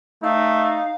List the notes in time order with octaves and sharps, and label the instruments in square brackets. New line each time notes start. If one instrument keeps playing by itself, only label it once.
[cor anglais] A3 [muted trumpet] D#4 [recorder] F5